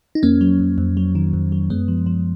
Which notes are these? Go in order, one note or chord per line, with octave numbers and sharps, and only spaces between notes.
D#4
F2 A#3 C#4
F#3
F2
F2
F#3
D#3
F2
F#3
F#2 G#3 B3
F3
F3